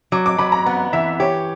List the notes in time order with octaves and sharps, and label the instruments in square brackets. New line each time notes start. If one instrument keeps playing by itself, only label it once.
[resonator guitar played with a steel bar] F#3 [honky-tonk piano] D6
[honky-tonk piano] D6
[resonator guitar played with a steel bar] F#3 [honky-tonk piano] B5
[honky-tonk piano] A#5
[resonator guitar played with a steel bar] B3 [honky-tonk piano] F#5
[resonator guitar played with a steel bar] E3 [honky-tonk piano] E5
[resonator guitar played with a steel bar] G4 [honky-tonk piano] C#5